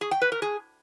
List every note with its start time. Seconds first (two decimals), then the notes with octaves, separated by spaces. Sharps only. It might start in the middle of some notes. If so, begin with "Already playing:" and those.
0.01 G#4
0.11 G5
0.22 B4
0.32 A#4
0.42 G#4